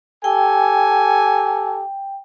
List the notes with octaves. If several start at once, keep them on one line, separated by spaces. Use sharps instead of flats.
G4 A4 G5 G#5